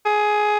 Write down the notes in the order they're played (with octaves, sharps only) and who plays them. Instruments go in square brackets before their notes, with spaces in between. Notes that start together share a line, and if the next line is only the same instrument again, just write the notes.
[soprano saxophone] G#4